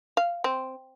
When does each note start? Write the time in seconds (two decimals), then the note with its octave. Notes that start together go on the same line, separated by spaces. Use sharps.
0.17 F5
0.44 C4